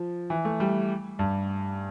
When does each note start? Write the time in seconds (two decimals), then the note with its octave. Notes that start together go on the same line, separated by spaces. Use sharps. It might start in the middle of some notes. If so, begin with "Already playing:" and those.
Already playing: F3
0.30 E3
0.45 A3
0.60 G3
1.19 G2